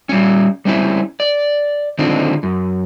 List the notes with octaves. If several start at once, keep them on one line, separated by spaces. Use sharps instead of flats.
G3 C#4
G3 C4 C#4 E4
D5
D3 D#3 F3 C4 D4
F#2